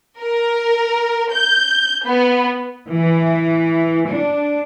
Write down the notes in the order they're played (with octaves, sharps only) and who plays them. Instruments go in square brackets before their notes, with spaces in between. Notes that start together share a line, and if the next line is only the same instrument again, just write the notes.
[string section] A#4
G6
B3
[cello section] E3
D4